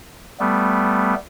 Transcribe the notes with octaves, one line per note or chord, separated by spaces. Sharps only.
G3 A3 B3